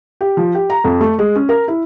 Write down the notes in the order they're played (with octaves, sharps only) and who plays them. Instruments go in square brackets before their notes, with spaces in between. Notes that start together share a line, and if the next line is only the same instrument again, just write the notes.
[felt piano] G4
F3
G4
A#5
F2
A3
G#3
C#4
A#4
E4